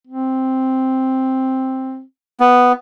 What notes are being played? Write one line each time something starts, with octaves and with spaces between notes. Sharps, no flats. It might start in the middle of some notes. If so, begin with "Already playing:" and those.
C4
B3